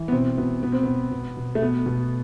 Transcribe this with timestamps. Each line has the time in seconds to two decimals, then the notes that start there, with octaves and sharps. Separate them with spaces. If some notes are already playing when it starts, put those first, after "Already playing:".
Already playing: E3
0.08 B3
0.12 B2 C4
0.38 B2 B3
0.63 B2 B3
0.72 C4
0.83 B2 B3
1.11 B2
1.37 B2
1.55 A3
1.62 B2 B3
1.86 B2